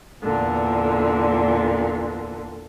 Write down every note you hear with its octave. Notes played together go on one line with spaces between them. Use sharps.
E2 A#2 D3